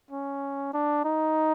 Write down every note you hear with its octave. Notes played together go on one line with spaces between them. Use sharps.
C#4
D4
D#4